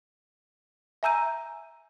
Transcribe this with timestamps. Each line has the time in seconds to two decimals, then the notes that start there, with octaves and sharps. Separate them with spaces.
1.03 E5 G#5 A#5 E6 G6 D#7